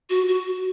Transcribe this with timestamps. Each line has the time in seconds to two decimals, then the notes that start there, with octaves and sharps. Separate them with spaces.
0.10 F#4
0.28 F#4